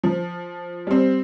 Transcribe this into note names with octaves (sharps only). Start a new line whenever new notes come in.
F3
G3 C4